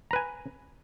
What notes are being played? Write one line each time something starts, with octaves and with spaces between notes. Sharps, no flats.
B4 G#5 A#5